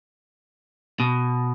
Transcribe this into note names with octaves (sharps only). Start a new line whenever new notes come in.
B2